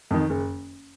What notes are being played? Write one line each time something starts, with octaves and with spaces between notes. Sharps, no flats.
F2 D#3
F#1